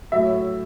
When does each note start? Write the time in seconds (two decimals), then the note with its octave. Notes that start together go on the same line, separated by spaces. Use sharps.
0.12 A2 F#3 E5